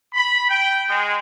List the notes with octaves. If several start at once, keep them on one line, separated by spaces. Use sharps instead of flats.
B5
G5
G#3